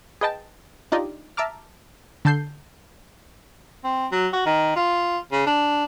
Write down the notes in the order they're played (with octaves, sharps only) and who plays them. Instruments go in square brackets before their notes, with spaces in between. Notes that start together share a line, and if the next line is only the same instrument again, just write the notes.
[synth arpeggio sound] G#4 B4 D#5 G5 A5
D4 D#4 F4 G4 D5 D#5
E5 A5 A#5 D6 F6
D3 A4 A5 G6 C7
[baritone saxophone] C4
F#3
F#4
D#3
F4
C#3
D4